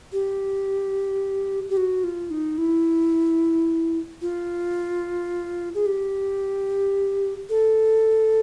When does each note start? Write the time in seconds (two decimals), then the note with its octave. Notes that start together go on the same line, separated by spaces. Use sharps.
0.12 G4
1.70 G4
1.77 F#4
2.04 F4
2.31 D#4
2.58 E4
4.22 F4
5.75 G#4
5.86 G4
7.50 A4